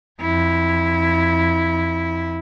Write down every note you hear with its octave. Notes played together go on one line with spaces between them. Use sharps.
F2 E4